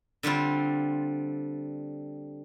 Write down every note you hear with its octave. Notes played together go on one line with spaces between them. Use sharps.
D3 G3 C4 F4